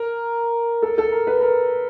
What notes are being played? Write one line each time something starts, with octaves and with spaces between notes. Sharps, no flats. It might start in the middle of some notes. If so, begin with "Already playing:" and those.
Already playing: A#4
A4
A4
A#4
B4
A#4